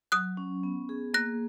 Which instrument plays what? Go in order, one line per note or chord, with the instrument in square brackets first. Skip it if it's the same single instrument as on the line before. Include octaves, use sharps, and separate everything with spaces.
[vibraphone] F#3 [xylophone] D#6 F#6
[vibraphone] C#4
B3
G#4
[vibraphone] A#3 [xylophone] F#6 A#6